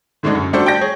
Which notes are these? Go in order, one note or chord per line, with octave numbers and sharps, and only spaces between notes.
G#2 D3 G#3 A3 D4 D#4
F#2
G3 A3 D4 F#4 A4 C5
D5 G5 A5 G6 A#6
G#4 C#5